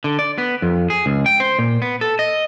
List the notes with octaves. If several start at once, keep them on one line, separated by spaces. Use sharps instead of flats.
D3
D5
B3
F2
G#4
C#2
G5
C5
A#2
B3
A4
D#5